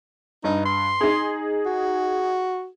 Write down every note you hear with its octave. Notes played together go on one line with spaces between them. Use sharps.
G2 D#4
C6
D#4 G#4
F#4